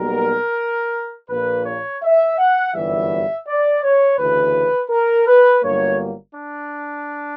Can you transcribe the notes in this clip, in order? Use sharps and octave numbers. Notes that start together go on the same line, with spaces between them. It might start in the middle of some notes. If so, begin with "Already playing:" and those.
Already playing: B1 B2 G3 A#3 A#4
A#1 A#2 A#3 B4
C#5
E5
F#5
G1 F#2 E3 G3 E5
D5
C#5
D2 C#3 E3 B4
A#4
B4
G1 G2 F#3 A#3 C#5
D4